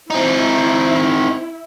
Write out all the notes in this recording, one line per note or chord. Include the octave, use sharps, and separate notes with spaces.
C4 D#4 E4